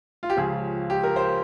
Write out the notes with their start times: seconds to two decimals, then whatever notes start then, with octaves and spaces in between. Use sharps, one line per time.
0.23 F4
0.30 G4
0.36 C#2 C#3 F3 G#4
0.90 G4
1.03 A#4
1.16 C5